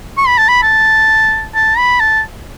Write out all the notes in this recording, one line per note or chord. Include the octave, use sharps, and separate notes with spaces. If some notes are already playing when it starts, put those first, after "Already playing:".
C#6
B5
A5
B5
A5
A5
B5
A5